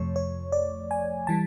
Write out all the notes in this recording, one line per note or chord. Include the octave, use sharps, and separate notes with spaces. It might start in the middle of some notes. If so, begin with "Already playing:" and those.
Already playing: F2 C3 F3 A3 C#5
C#5
D5
G#5
E3 G3 A5